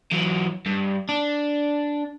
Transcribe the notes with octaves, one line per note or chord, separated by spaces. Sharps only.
E3 F#3
G2
D4